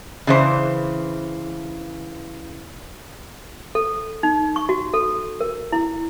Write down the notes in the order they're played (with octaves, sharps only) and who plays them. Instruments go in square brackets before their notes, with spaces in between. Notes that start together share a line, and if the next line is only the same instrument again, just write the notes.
[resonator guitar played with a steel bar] C#3 E3 C5
[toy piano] A4
D#4
C#6
F#4
A4
A#4
E4